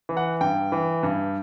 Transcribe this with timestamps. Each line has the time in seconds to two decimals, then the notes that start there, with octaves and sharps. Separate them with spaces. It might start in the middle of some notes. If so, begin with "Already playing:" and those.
0.09 E3
0.17 F#5
0.41 G2 G5
0.72 E3
1.03 G2